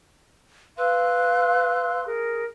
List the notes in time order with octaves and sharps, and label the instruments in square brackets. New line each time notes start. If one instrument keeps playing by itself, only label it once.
[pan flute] B4 [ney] F5 [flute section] C6 E6 F#6
[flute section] G#4 A#4